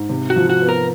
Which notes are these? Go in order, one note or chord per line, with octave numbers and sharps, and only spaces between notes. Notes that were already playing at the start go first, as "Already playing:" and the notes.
Already playing: G#2
C3
F#4
F3
F#4
B3
A#4